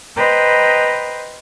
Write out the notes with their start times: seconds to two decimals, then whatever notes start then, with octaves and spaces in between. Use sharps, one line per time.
0.16 B4 C5 D#5 G5 A#5 B5